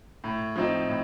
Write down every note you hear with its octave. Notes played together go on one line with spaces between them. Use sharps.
A2
F3 C4 D#4
A2